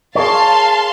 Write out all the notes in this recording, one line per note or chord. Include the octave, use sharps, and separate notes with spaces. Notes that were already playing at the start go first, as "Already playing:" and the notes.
G#4 A#4 C#5 F5 A5 C6